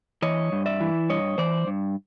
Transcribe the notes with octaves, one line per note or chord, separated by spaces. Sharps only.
E3 C#5 D#5
G2
D5 E5
E3
G2 C#5 D#5
E3 C5 D5
G2